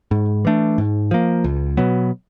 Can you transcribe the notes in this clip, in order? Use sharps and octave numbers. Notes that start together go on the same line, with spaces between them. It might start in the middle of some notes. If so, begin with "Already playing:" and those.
G#2
E3 A3 D4
G#2
F3 A#3
C#2
B2 F#3 B3